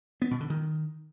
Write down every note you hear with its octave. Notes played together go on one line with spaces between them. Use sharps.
B3
B2
D3
D#3